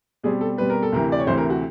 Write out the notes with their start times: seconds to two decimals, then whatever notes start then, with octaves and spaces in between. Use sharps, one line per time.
0.24 B2 G3 C4 G#4
0.41 A4
0.57 B2 G3 C4 B4
0.70 A#4
0.83 A4
0.92 D2 C3 E3 A#4
1.12 D5
1.19 C#5
1.27 D2 C3 E3 C5
1.38 A#4
1.50 F#4